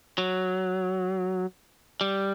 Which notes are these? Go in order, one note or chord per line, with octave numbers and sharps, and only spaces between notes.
F#3
G3